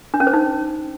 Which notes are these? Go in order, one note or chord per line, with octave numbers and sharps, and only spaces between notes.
D4
C#4
C5
D#4